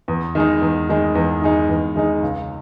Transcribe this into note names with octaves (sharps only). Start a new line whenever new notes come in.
E2
D#3 G#3 D#4
E2
D#3 G#3 D#4
E2
D#3 G#3 D#4
E2
D#3 G#3 D#4
C#2